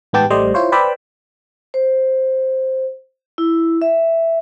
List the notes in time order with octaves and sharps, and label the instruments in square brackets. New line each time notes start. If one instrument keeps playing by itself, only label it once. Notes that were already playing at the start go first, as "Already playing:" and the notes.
[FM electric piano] A1 G#2 B3 G4 G5 A5
A1 G3 A3 C5 D5 D#5
E4 F4 C5 C#5
B4 C5 D5 G5 B5 E6
[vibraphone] C5
E4
E5